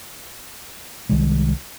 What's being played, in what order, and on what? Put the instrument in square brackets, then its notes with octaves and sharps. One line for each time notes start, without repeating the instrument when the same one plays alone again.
[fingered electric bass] C2 D#3 G3 G#3